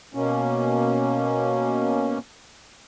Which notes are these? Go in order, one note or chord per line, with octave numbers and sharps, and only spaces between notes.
B2 A#3 C#4